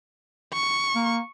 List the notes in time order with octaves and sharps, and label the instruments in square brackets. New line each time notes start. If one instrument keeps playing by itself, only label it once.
[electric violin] C#6
[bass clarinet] A#3